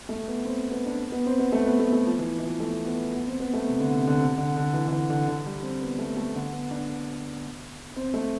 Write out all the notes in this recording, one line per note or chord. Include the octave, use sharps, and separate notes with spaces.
A3
B3
C4
B3
D4
B3
C4
B3
A3
B3
A3
A3
F3
E3
E3
F3
A3
B3
B3
C4
B3
A3
C3
D3
C3
D3
C3
D3
D3
E3
D3
E3
D3
D3
G3
C4
B3
A3
A3
D3
B3
D4
C4
A3